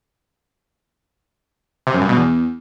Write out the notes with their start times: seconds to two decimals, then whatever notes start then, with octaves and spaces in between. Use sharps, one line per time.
1.87 C3
1.94 F#2
2.02 G2
2.09 B2
2.16 E2